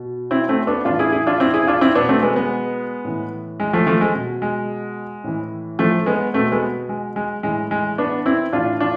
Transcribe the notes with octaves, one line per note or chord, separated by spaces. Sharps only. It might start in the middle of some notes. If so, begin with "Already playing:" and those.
Already playing: B2
C4 E4
A3 C4
B3 D4
A2 E3 D4 F4
E4 G#4
E4 G#4
D4 F4
C4 E4
E4 G#4
D4 F4
C4 E4
B2 B3 D4
A3 C4
G#3 B3
G#3 B3
A2 E3
G#3
F3 A3
F3 A3
G#3
B2
G#3
A2 E3
F3 A3
G#3 B3
B2 A3 C4
G#3 B3
G#3
G#3
A2 E3 G#3
G#3
B3 D4
C4 E4
A2 E3 D4 F4
D4 F4